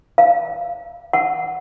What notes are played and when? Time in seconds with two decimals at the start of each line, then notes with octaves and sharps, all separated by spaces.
0.18 F5
1.13 F#5